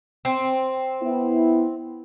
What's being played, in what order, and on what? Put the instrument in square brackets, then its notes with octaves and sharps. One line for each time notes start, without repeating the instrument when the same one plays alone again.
[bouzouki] C4
[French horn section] B3 E4